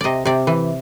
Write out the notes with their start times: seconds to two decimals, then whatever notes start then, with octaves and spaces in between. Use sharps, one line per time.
0.01 C3 D5 D#5
0.25 C3 D5
0.47 E3